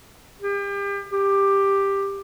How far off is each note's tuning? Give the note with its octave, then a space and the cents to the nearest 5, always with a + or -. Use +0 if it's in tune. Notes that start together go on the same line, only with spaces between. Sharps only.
G4 +35
G4 +10